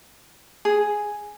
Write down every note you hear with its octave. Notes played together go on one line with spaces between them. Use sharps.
G#4